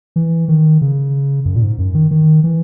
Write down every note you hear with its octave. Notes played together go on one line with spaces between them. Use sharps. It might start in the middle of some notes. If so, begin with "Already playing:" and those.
E3
D#3
C#3
F#2
A#2
G#2
F#2
D#3
D#3
E3